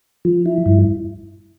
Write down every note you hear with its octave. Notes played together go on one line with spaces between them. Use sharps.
F3
E4
G2